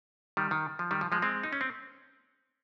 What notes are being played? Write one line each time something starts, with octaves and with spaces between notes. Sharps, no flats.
D#3 G3
D#3
F3
D#3 G3
F3
F3 G#3
G#3 C4
D#4
C#4
C4